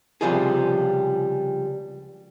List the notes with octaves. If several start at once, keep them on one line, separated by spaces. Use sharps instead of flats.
C#2 C3 F3 G3 F4 G#4